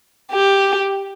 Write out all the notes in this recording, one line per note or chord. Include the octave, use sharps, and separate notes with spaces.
G4